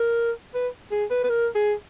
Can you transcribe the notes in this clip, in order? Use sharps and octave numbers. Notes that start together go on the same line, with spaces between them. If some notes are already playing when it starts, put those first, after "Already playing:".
Already playing: A#4
B4
G#4
B4
B4
A#4
G#4